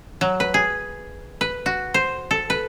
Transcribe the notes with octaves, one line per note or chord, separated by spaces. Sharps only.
F#3
B4
G#4
B4
F#4
C5
A4
B4